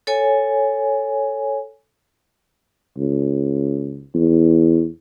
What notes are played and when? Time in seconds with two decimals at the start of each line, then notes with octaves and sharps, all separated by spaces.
0.07 A4 C#5 G#5
2.98 C#2
4.14 E2